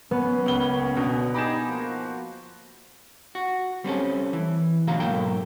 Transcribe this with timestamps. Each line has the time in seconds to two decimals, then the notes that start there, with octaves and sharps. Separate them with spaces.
0.11 A#3 B3 C#4
0.46 C#2 G7
0.96 B2 D3
1.34 D#4 G4 G#4 B5 E7
1.68 F3 A#3 F#4
3.35 F#4
3.84 G3 C4 C#4 A4
4.33 E3
4.87 B1 A2 D3 F#4 F5 A#5
5.00 B1 G#2 A#3 A4 G5